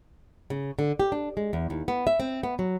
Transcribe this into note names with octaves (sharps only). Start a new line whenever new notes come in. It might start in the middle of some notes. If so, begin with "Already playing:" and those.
C#3
D3
G4
D4
G#3
E2
D#2
B3
E5
C4
B3
F#3